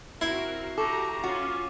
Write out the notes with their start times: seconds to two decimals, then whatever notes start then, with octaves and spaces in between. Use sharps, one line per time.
0.21 C4 E4 F#4 A#4 C7
0.78 F#4 G4 A4 A#5 C#6 D6
1.24 C#4 F4 F#4